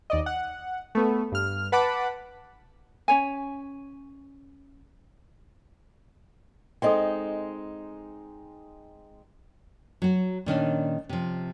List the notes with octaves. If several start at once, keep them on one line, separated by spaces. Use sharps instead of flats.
D#2 D5 D#5
F#5
A3 B3
G2 F6
B4 F#5 A5 B5 D6
C#4 C#5 G#5
G#3 C4 D#4 A4 D#5 G5
F#3 F#4
A#2 D#3 C#4 D4
C3 F3